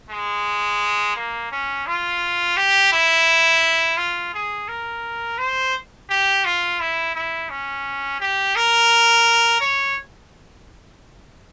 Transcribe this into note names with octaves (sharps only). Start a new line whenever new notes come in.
G#3
A#3
C#4
F4
G4
E4
F4
G#4
A#4
C5
G4
F4
E4
E4
C#4
G4
A#4
C#5